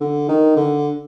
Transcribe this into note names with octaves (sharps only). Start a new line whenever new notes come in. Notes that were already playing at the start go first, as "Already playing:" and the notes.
D3
D#3
D3